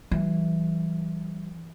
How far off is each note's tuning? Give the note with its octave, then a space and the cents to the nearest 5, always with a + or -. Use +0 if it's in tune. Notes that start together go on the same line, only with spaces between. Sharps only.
E3 +0 G3 -40